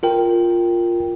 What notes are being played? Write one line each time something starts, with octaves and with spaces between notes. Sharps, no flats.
F4 A#4 G5